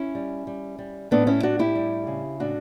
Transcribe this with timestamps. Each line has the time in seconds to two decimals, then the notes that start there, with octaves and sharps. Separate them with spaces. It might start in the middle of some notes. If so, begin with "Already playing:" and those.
Already playing: C#4 E4
0.15 G3
0.47 G3
0.79 G3
1.11 A2 B3 D4
1.27 C#4 E4
1.43 A2 D4 F#4
1.59 E4 G4
1.75 G3
2.07 C#3
2.40 A2 D4 F#4